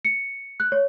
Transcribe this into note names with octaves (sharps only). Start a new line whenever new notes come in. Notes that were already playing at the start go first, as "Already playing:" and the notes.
C#7
F#6
C#5